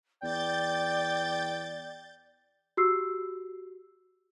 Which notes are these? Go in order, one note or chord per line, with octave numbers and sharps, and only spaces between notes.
E2 D5 G5 G6 A6
F#4 G4 E6 C7